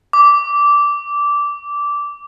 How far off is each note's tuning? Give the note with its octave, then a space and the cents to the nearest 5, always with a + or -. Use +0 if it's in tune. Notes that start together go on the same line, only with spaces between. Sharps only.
D6 -15